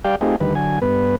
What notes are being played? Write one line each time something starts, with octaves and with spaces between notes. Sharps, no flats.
G3 G4 D5 F5 G5
A3 C4 D#4 F4 G4 G#4
D2 D#3 G3 B4
D3 F#3 G#5
G2 B3 B4